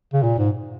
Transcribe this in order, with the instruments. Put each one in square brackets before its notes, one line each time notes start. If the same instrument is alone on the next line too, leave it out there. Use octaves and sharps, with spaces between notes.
[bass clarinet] C#3
A#2
G#2